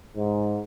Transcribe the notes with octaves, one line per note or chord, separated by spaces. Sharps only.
G#2